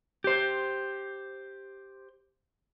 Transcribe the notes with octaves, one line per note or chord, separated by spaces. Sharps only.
G4 C5